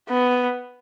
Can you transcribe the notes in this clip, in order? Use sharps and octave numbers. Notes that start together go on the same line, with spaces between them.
B3